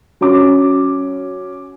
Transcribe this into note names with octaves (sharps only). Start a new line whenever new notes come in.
F#3 C#4 D6